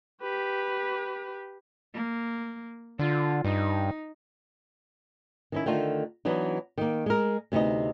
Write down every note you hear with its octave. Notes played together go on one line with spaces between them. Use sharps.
G4 B4
A#3
D3 F4
G2 D#4
D#3 C#4 E4
D3 D#3 A3 F4
E3 F#3 B3 D4 D#4
D#3 A#3
G#3 A#4
D2 C3 B3 D#4 D#5